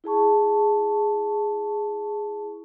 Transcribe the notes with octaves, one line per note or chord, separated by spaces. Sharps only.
E4 G#4 A5 C#6